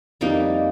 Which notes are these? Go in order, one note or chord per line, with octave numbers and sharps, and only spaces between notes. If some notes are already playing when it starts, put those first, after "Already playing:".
F2 G3 A#3 D#4